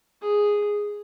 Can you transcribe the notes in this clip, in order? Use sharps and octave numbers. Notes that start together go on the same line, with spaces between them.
G#4